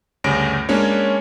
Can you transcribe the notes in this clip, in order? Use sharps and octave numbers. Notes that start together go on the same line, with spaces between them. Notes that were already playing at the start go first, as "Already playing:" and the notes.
D2 G2 C#3 C#4 A#6 D7
G#3 A#3 C#4 D4 C#5